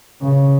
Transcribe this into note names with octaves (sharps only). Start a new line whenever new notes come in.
C#3